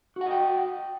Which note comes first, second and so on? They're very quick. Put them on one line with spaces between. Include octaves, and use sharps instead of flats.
F#4 F#5 D#5 G5